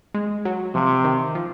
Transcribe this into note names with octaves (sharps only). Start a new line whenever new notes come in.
G#3
F#3
C3 F3
D#3
F3